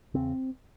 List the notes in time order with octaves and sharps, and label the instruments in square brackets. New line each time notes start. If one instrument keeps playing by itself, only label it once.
[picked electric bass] E2 C#3 C4